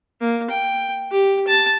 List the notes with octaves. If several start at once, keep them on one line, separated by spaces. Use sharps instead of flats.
A#3
G5
G4
A5